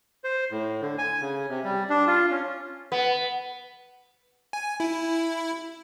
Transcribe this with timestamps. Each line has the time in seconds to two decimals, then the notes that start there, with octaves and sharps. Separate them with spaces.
0.24 C5
0.51 A2
0.82 D3
0.98 G#5
1.21 C#3
1.49 C3
1.64 G3
1.90 D4
2.07 F4
2.31 C#4
2.92 B3
4.53 G#5
4.80 E4